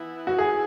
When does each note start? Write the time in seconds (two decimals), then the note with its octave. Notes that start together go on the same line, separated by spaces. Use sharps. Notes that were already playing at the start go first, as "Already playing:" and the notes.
Already playing: E3 B3 E4
0.27 F#4
0.38 G#4